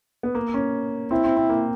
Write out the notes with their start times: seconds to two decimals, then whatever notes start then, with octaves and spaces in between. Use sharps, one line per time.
0.23 B3
0.35 A#3
0.54 C#4
1.11 C4 E4
1.24 C4
1.36 C4
1.49 A#3